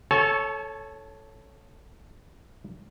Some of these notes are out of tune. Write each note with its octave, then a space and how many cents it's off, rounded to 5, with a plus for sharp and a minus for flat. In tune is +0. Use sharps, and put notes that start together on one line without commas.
A4 +0 C#5 +0 A5 -40